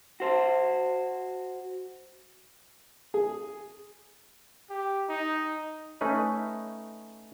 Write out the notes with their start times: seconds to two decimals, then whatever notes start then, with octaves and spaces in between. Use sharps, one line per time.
0.20 F#4 C5
3.14 G#4
4.70 G4
5.09 D#4
6.01 A3 C#4 D#4 B4